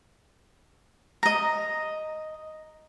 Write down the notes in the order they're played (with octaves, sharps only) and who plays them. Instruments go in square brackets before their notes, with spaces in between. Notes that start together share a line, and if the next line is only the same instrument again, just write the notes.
[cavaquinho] D#5 A#5